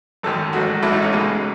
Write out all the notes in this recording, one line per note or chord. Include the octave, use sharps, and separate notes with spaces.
G#1 F#2 D#3 A4
A1 G#2 F#3 A3 F#4
A1 G#2 F#3 A3 E4
D#4
C#4
C#2 B2 G#3